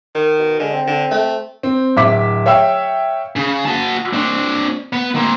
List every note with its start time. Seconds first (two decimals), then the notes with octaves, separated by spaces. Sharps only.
0.15 D#3
0.39 B2
0.59 D3 G#3
0.73 C4
0.87 D3
1.11 A3
1.63 C4
1.97 D1 E5 D6 B6
2.46 C#5 E5 F5 G5 E6
3.36 C#3
3.65 F#4 A5
4.13 C4 D4
4.93 B3
5.15 A#3 C4